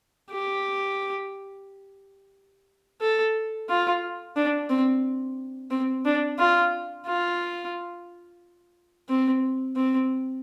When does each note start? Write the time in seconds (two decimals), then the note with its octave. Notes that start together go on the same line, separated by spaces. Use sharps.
0.31 G4
3.01 A4
3.69 F4
4.36 D4
4.70 C4
5.71 C4
6.05 D4
6.39 F4
7.07 F4
9.09 C4
9.76 C4